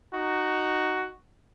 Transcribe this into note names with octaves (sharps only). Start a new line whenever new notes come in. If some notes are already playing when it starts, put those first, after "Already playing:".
D#4 F#4